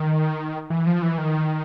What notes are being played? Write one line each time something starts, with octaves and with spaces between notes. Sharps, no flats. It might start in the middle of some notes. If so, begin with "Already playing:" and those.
Already playing: D#3
E3
F3
E3
D#3